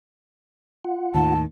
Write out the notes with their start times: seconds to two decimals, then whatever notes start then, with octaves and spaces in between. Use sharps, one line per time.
0.85 F4 F#5
1.14 D#2 A2 D#3 A5